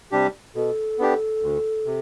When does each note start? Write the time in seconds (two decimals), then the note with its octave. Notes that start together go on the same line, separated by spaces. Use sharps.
0.12 C3 G3 D4 G4
0.55 B2 A4
0.99 B3 D4 G4
1.42 D2
1.86 C3